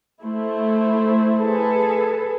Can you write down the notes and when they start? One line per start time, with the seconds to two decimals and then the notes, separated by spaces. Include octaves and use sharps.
0.24 A3 E4 C5
1.37 G#4 A4 B4